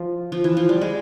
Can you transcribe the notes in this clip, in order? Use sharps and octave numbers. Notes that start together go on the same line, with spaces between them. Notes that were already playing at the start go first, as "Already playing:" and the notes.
Already playing: F3
F3
E3
F3
G3
G#3